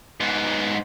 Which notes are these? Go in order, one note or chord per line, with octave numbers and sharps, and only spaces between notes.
G#2 B3